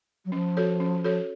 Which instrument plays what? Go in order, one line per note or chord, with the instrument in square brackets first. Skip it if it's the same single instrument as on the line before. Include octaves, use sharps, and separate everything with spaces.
[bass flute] F#3
[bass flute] F3 [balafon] C#4
[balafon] F#4 A4 C#5
C#4
F#4 A4 C#5